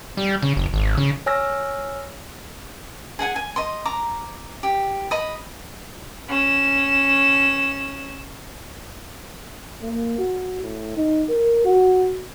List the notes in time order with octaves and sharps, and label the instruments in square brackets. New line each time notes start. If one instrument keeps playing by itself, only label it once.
[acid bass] G3
C#3
F#1
G#1
C#3
[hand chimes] C#5 G#5 E6 F6 A#6
[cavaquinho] G#4 F#5 G#5
G#5
D#5 C6
A#5 D6
G4
D#5 B5
[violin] C#4 E7
[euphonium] A#3
F#4
A2
D#4
A#4
F#4